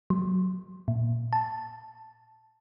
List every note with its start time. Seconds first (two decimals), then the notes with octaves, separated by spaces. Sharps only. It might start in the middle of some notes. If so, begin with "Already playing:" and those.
0.10 F#3
0.88 A#2
1.33 A5